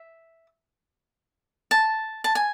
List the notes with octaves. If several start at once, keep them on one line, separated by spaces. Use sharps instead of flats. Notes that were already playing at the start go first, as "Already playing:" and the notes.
Already playing: E5
A5
A5
G#5